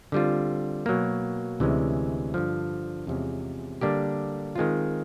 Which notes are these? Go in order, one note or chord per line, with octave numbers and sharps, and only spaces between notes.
D3 G3 C4 F4
B2 F#3 A#3
D2 C3 E3 G#3 C#4
G2 D3 F3
E2 C3 F3 G#3 C#4
D3 G3 A#3 D4 G4
D#3 G#3 C4 F4